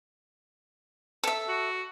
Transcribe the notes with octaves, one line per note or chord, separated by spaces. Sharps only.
A4 E5
F#4